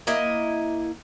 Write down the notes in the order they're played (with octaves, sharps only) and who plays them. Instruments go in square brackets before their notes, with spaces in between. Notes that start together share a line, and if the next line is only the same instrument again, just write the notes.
[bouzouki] A#3 E4 D#5